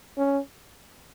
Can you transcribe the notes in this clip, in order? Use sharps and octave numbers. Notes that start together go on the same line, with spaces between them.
C#4